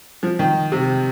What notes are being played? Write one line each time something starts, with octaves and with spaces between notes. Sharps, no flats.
F3
D#3
C3